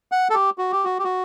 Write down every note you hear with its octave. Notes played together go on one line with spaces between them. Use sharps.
F#5
A4
G4
F#4
G4
F#4
G4
F#4